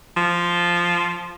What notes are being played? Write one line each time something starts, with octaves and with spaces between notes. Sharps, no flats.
F3